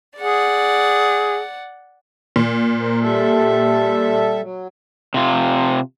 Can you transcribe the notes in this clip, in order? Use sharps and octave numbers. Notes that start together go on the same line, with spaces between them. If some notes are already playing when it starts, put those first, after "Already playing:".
G#4 D5 F#5
A#2
A#4 C5
G3 A4 E5
F#3
C3 F4